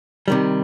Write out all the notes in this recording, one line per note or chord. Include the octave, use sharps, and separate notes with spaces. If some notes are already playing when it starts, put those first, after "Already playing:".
C3 D#3 G3